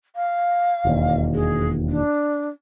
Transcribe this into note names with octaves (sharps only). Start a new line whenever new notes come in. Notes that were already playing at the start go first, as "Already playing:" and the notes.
F5
E1 D#2
G#4
D4